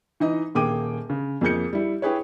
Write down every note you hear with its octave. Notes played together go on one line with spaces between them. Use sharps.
E3 D#4 D#5
D#1 A#3 G#4 G5 D6 D#7
C#3
F2 A#3 G#4 G6 C#7
G3 E4
E4 G4 G#4 B4 C#5